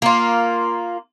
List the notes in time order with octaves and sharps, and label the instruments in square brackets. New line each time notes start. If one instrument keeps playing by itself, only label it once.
[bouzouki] A#3 F4